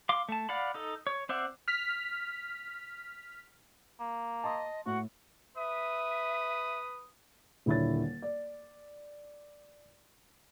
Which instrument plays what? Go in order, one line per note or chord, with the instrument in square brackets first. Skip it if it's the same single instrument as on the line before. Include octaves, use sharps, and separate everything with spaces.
[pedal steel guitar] F5 C6 D6
A3 A5
D5 F5 F#5 B5
D#4 A4
C#5
C4 C5 D5 E5 F#5
[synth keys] F6 B6
[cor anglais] A#3
[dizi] D#5 [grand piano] A5 C6 D#6
[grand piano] A2 [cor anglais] F#4 [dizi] F#5
[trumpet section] B4 D#6 [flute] E5
[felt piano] D#1 D3 E4 C#5 A6
D5